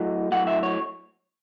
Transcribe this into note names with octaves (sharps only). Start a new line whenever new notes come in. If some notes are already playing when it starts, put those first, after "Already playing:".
Already playing: A2 F#3 D#5
A2 F#3 F#5
E5
C#5